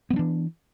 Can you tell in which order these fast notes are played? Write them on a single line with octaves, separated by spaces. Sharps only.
B3 F#3 D4 E3